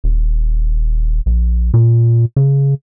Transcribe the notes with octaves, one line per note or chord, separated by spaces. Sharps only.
D#1
A#1
A#2
C#3